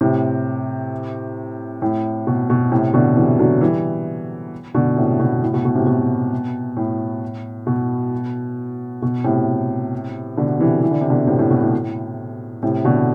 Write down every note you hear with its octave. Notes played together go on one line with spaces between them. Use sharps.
A2 C3
A2
B2
B2
A2 C3
B2 D3
C3 E3
D3 F#3
E3 G3
B2 D3
A2 C3
B2
A2
B2
B2
A2 C3
B2
A2
B2
B2
A2 C3
B2 D3
C3 E3
E3
D3
C3
B2 D3
A2 C3
A2
B2
A2
A2
A2 C3
B2 D3